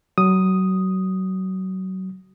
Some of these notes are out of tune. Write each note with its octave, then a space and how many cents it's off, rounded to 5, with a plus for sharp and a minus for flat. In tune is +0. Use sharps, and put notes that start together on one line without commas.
F#3 +25 D#6 +0